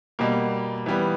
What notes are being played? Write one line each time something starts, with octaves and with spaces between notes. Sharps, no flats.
B2 G3 A#3
E3 G3 B3